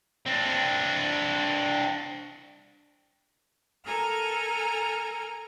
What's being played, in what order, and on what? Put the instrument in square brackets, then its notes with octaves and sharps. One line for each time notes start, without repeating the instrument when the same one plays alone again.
[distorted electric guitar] C4 D4
[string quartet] A4 A#4 G#5 A#5 F6